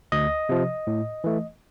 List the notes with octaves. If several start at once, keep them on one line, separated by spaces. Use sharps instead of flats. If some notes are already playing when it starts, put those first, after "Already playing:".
D2 D#5
C3 F3
A2
E3 A3